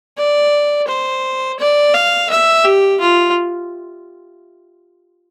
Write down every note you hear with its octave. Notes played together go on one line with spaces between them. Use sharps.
D5
C5
D5
F5
E5
G4
F4